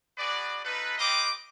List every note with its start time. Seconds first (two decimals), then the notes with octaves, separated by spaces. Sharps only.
0.18 F#4 G#4 B4 D5
0.65 D#4 F4 A4 B4
0.98 C4 G4 B4 D#5 F5 D6